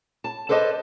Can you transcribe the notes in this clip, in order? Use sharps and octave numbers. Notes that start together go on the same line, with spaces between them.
A5
A4 B4 C5 D5 D#5 A5